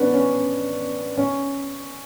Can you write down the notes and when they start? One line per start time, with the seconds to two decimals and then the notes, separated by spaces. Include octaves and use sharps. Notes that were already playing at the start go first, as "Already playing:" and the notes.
Already playing: B3 C#4 D4
0.14 C#4
1.17 C#4